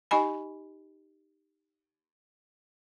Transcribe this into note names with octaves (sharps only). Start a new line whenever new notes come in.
D#4 G4 D#5 G#5 B5